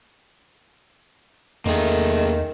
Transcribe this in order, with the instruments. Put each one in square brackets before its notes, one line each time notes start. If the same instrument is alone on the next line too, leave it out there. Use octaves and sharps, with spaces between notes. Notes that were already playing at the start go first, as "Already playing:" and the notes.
[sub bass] E2 [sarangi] D#3 [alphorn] A3 [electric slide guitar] A#3 G#4